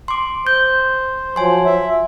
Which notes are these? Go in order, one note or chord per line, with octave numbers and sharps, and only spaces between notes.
C6 D6
C5 G6
F3 F#3 G#5 C6
E5